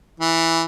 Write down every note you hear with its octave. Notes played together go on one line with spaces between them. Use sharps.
E3